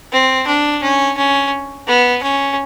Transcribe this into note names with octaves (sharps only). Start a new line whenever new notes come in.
C4
D4
C#4
C#4
B3
C#4